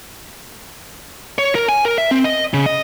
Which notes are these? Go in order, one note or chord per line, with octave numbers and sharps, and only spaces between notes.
C#5
A#4
G#5
A#4
E5
C4
D#5
C#3
D#5